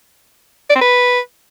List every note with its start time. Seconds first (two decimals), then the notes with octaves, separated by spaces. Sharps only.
0.70 D5
0.75 C4
0.81 B4